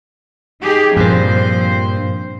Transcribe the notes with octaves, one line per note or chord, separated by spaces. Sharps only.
D#4 G4 G#4
G2 A#2 F3 C4 C5